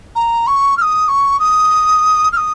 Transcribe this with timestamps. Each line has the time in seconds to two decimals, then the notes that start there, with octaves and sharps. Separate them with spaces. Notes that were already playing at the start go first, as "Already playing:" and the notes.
0.15 A#5
0.47 C#6
0.77 F6
0.82 D#6
1.08 C#6
1.39 D#6
2.32 F6
2.37 D#6